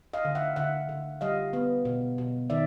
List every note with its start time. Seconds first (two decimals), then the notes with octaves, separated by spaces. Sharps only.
0.13 D#5 F5
0.25 D3
0.35 E5 F#5
0.56 D3 E5 F#5
0.89 D3
1.21 G3 D#5 F5
1.53 B3
1.85 B2
2.18 B2
2.50 D#3 D5 E5